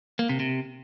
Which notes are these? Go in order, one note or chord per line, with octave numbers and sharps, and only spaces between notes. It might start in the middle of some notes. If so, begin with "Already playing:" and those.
A#3
C3
C3